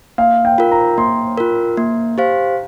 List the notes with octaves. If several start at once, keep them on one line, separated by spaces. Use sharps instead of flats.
A#3 F5
G5
F4 A#4
A#5
A#3 C6
F4 A#4
A#3
G4 C5 F5